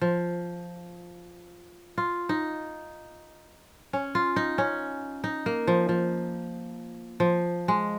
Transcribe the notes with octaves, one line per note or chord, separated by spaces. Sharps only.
F3
F4
D#4
C#4
F4
D#4
C#4
D#4
A#3
F3
F3
F3
G#3